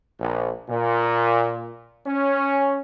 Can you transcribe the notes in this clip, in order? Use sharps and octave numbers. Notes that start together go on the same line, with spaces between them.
A#1
A#2
C#4